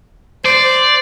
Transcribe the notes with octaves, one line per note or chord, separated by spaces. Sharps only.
C5 D5